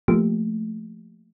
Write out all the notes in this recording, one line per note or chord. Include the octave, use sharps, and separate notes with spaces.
F3 A3 A#3 G4